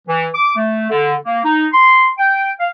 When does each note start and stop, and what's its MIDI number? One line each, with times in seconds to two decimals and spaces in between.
0.08 0.27 52
0.34 0.54 86
0.56 0.86 57
0.90 1.14 50
1.25 1.39 58
1.44 1.66 63
1.72 2.09 84
2.18 2.50 79
2.59 2.68 77